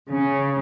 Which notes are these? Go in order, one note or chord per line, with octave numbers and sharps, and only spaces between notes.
C#3